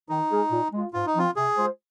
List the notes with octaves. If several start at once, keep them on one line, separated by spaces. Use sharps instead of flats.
D#3 D#4
G#3 F4 G#4
A#2
G#3 F4
G#2 F4
D#4
F3 C4 F4
C3 G#4
G#3 F4 C5